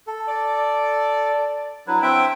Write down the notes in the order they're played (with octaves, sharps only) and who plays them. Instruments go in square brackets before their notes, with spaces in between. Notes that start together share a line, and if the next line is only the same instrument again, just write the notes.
[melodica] A4
[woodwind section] D5
[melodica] F#3 B4 [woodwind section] D4 E4
[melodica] C4 E5 G5